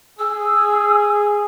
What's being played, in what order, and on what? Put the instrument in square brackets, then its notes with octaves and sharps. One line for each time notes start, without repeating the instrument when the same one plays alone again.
[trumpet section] G#4 [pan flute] E6